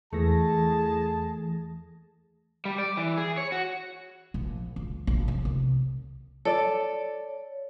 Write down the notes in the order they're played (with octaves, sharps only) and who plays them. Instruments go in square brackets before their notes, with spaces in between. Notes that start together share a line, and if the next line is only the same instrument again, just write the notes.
[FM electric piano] E2 E3 A#6 [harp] A3 [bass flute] G#4 [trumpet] A5
[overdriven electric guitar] G3
D5
E3
G#4
C#5
F#4
[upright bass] A#1
C#2
A#1
C#3
C2
[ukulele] A4 D5 [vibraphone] C#5